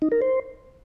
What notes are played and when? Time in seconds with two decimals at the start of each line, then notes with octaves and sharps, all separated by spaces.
0.02 D#4
0.12 A#4
0.22 C5